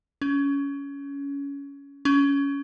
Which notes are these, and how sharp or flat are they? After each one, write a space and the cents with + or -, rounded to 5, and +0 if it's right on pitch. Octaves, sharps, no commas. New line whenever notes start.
C#4 +20
C#4 +20